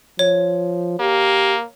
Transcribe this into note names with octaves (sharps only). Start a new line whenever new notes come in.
F3 C#5
A#3 G4